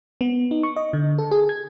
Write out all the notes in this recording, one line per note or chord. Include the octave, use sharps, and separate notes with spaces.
B3
D#4
C#6
D#5
D3
A4
G#4
G#6